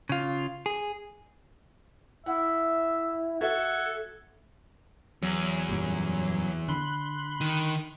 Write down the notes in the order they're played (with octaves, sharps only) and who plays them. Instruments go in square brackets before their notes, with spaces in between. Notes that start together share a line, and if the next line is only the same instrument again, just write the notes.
[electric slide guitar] C#3 F4
G#4
[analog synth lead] E4 [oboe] E5 [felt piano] F#5
[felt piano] F#4 E5 [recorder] A4 [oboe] F#5 [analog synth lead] G#6
[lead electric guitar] E2 [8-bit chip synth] F#3
[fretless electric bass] F#2 A#2 G3
[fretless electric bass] D3 [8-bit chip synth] B5 C6 F#6
[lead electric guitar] D#3